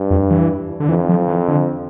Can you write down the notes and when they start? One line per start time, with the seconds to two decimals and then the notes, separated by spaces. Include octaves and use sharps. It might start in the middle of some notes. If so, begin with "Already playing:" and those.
Already playing: G2
0.11 F2
0.30 E3
0.80 D3
0.89 F2 E3
1.09 F3
1.28 E3
1.48 D3